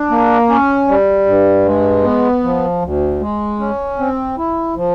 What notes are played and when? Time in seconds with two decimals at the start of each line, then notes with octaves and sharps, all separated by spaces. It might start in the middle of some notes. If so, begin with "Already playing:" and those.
Already playing: D4
0.10 A#3
0.49 C#4
0.88 G3
1.26 G2
1.66 G#3
2.04 B3
2.44 F3
2.82 D2
3.21 G#3
3.59 C#4
3.99 C4
4.38 E4
4.76 F3